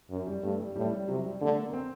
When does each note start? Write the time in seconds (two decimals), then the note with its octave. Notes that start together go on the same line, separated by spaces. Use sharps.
0.10 F#2
0.27 G3
0.43 G2 A3
0.60 G3
0.76 A2 G3
0.92 G3
1.08 C3 F#3
1.24 G3
1.41 D3 A3
1.57 A#3
1.68 A#3
1.74 C4